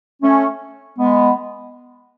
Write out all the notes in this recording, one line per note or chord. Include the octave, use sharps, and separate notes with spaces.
A3 C#4
G#3 B3